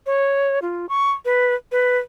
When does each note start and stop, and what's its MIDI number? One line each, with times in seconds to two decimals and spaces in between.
0.06 0.59 73
0.62 0.86 65
0.89 1.11 85
1.25 1.55 71
1.72 1.98 71